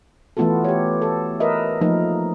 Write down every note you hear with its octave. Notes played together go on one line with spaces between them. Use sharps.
E3 A3 B3 F4 F#4 A4
G4 C#5
A4
A#4 B4 D#5 E5
F3 A3 A#3 D#4 A#4